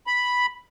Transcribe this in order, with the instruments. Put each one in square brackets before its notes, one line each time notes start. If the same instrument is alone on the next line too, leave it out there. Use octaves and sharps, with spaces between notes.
[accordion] B5